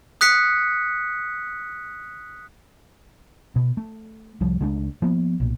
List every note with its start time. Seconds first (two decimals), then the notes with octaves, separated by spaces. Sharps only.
0.21 D#6 F#6 B6 C#7
3.56 B2
3.77 A3
4.41 C2 F3 G3
4.61 C#2 G#3 A3 D4
5.02 F3 A#3 B3
5.40 B1 A#2